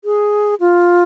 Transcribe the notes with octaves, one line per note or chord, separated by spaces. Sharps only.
G#4
F4